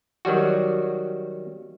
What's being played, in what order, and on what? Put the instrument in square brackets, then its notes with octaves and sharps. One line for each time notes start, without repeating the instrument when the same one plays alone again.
[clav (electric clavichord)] D#3 F#3 G3 F#4